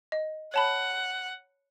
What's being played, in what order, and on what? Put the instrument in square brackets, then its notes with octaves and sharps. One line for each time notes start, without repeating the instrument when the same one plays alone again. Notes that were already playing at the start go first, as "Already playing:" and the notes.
[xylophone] D#5
[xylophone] C#5 A5 B5 [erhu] F#5